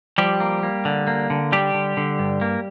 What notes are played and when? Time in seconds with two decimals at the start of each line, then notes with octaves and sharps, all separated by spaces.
0.18 F3 G3 G4
0.40 A#3
0.63 A#3
0.85 D3
1.07 A#3
1.30 D3
1.52 G3 D4 G4
1.74 D3
1.97 D3
2.19 G2
2.41 A#3